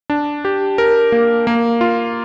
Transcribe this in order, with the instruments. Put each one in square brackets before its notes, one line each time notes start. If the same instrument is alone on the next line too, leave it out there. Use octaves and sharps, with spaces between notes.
[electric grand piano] D4
G4
A#4
A#3
A#3
F4